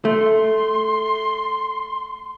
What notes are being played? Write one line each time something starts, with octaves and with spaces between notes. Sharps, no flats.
A3 C6